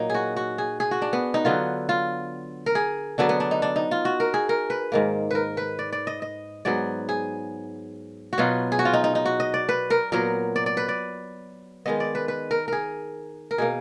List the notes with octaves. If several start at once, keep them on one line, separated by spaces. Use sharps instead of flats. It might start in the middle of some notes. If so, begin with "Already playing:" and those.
Already playing: A#2 F#3 A#3 D#4
F#4 G#4
F#4
G#4
G#4
F#4
D4
B3
D#4
D3 F#3 B3 F4
F4
A#4
G#4
D3 F#3 B3 D4
B3
D4
D#4
D4
D#4
F4
F#4
A#4
G#4
A#4
B4
G#2 D#3 A#3
A#4 B4
B4
D5
D5
D#5
D#5
G#2 F#3 B3 D5
G#4
F#4
B2 F#3 B3 F4
G#4
F#4
F4
D#4
D#4
D#4
F#4
D#5
D5
B4
A#4
A#2 F#3 B3 A#4
D5
D5
B4
D5
D#3 G#3 B3 D#5
D5
B4
B4
A#4
G#4 A#4
A#4
B2 A#3 G#4